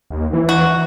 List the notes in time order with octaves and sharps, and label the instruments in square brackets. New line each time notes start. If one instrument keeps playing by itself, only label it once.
[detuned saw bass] D#2
E3
[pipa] F#4